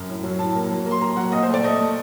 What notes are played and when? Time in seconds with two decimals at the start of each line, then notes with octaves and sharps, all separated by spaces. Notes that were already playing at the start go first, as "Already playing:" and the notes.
Already playing: F#2
0.09 A2
0.23 F#3
0.39 A2 A5
0.55 A#3
0.70 F#3
0.86 A#3
0.91 C6
1.01 A#3 A#5
1.16 F#3 F#5
1.32 A#2 D#5
1.43 C5
1.47 A3
1.54 D5
1.63 A3 D#5
1.79 A3